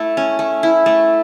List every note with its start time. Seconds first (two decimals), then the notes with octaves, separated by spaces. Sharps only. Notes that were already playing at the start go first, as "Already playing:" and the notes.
Already playing: A3 E4
0.17 C#4
0.39 A3
0.63 E4
0.86 A3